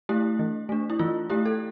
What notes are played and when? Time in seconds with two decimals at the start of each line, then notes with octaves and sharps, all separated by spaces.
0.09 A3 E4 G4
0.39 E3
0.69 A3 D4
0.90 E4
0.99 E3 F4
1.30 A3 E4 G4
1.46 A4